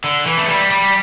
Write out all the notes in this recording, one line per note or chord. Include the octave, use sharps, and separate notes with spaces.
D3
E3
A3
G3
G3